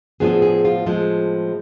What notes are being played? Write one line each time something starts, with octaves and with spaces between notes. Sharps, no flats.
A2 F3 B3 D4 G#4
G#4
F4
A2 F3 G#3